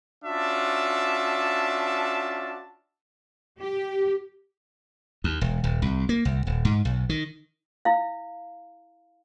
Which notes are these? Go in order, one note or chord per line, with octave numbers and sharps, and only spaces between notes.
C#4 D4 F4 F#4 E5 A5
G4
D#2
E1
D#1
C2
A#3
C2
D#1
G#2
B1
D#3
E4 F5